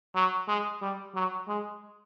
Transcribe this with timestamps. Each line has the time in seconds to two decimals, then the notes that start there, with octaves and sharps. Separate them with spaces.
0.15 F#3
0.48 G#3
0.82 G3
1.15 F#3
1.48 G#3